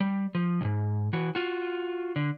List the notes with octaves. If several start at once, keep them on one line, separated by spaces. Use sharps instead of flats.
G3
F3
B1 G#2
E3 F#4
F4 F#4
D3